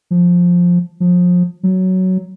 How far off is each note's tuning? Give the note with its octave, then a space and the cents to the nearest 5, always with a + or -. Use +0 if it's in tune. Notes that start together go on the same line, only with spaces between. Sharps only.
F3 +10
F3 +30
F#3 +10